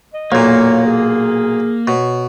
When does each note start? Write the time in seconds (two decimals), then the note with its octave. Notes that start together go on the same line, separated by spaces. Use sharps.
0.14 D#5
0.32 B1 A#2 A#3 C#5
0.85 G#4
1.88 B2 C#5